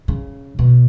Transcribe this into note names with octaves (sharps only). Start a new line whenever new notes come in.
C#3
B2